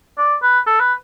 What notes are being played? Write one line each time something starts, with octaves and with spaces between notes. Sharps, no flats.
D5
B4
A4
B4